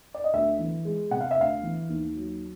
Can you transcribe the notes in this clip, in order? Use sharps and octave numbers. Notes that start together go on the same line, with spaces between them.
D5
D#5
D2 E5
E3
G#3
C3 F#5
F5
E5
D2 F5
E3
D#2
F#3